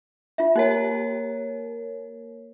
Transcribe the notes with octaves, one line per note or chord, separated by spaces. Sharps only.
F4 E5
A#3 A#4 C#5